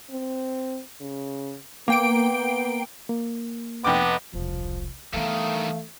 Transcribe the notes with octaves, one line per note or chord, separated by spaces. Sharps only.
C4
C#3
A#3 B3 G5 D7
A#3
F1 B3 G5 D6
E1 C2 F3
G2 D#3 E3 A3 B3 F5